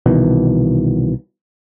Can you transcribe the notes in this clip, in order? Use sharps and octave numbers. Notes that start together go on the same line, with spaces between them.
C2 B2 D#3 E3